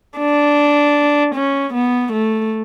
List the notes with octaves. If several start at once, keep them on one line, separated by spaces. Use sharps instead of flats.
D4
C#4
B3
A3